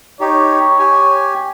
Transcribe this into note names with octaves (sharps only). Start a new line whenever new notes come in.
D#4 G4 C#5
G4 G#5